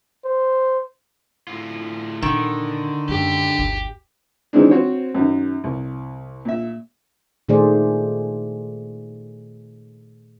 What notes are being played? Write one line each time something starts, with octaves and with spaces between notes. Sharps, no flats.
C5
A2 F4
A#2 D3 D#3 A#3
F#2 G#3 G4
G1 D2
D#3 E3 G#3 C4 D4
C4 F#4 C5 C#5
F#2 D#3
C2
A#2 E5
A#2 D#3 A3 G#4 C5 D5